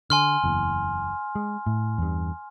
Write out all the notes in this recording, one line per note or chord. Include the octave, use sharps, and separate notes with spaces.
D3 G#5 C6 F6
F#1 E2
G#3
A2
E2 G2